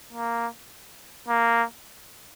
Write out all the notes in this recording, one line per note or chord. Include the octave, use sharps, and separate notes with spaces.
A#3
A#3